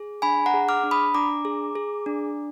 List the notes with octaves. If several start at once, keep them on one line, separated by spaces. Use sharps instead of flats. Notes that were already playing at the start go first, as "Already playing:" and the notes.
Already playing: G#4
D4 G#5 B5
F#5 A#5
G#4
D6 F6
D4
B5 D#6
D4 A#5 D6
G#4
G#4
D4